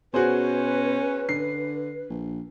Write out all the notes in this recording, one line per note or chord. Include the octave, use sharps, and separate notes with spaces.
B2 C#4 F#4 G#4 B4 C5
D3 C7
A#1